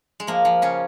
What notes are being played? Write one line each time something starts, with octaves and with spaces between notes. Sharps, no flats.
G#3
F3 A#3
F3
C#3 C#4